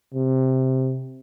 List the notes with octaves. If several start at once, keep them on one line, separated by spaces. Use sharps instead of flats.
C3